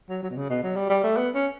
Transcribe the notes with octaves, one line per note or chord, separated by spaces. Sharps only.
F#3
F#3
B2
C#3
B2
F#3
G3
G3
A3
B3
C#4